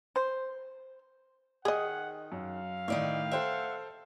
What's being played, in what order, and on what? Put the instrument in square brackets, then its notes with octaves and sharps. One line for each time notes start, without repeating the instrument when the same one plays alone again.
[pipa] C5
[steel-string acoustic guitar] D#3 [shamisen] G#4 D#5 [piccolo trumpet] F#5
[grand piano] F#2 [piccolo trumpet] F5
[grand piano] A2 D#3 [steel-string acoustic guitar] D#4 D5 E5
[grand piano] A4 C5 G5 [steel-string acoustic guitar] E5 F#5